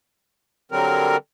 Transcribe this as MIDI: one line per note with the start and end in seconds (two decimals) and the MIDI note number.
0.72 1.17 50
0.72 1.17 54
0.72 1.17 55
0.72 1.17 60
0.72 1.17 70